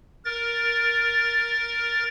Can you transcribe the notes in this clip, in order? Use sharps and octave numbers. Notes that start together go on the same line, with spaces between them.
A#4 A6